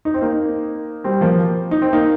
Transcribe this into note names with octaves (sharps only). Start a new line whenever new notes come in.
D#4
C4
A#3 D#4
G3 C4
F3 A#3
D#4
C4
A#3 D#4